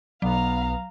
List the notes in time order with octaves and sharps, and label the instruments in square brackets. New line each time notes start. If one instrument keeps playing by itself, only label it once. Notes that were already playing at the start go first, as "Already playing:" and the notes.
[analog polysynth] B1 B3 [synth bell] F#3 [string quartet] F5 A#5